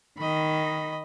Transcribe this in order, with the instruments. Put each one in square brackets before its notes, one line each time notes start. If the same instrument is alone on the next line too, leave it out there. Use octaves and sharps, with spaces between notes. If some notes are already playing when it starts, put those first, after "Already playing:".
[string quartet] D#3 [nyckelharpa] D#5 B5